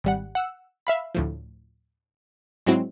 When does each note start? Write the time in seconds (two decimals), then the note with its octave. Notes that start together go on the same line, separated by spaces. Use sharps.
0.04 G#1 G3 F#5
0.35 F#5 E6
0.87 E5 F5 B5
1.15 D2 A2 F3
2.66 G#2 F#3 G#3 C4 E4 F#4